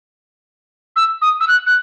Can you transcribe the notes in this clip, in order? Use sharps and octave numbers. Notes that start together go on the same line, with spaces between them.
E6
D#6
E6
F#6
F#6